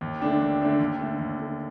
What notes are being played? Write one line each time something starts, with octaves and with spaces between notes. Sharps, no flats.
D#2
D3 A3 D4 G4
D#2
D3 A3 D4 G4
D#2
D3 A3
D#2
D3 A3